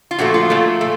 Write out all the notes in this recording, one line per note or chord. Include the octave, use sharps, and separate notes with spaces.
F4
A#2 F3 A3 F#4
F4
A#2 F3 A3
A3